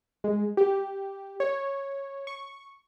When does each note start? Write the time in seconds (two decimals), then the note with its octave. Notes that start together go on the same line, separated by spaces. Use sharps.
0.24 G#3
0.57 G4
1.40 C#5
2.27 C#6